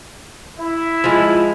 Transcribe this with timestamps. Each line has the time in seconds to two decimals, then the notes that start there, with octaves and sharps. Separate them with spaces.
0.59 E4
1.04 F3 G#3